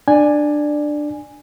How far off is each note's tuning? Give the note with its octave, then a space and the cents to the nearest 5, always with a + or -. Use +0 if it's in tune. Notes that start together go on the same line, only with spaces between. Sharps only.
D4 +15 D5 +10 G#5 -5